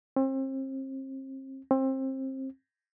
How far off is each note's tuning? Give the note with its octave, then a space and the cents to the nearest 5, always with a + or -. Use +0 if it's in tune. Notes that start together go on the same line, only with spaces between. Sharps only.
C4 +35
C4 +25